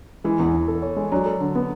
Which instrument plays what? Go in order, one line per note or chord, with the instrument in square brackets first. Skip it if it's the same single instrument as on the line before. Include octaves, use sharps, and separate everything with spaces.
[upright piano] E3 [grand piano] G#3
[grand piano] E2
E2
A4
C#5
G#3
[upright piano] F#3 [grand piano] D4
[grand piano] A4
D3
B3